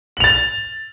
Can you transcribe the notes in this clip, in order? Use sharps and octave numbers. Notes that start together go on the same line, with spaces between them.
A6 F7 F#7